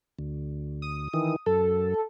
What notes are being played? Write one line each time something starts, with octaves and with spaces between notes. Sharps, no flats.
D2
D#6
D#3 E3
F#2 A4